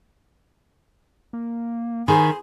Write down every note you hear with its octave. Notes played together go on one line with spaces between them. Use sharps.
A#3
D#3 G#4 C5 G#5 B5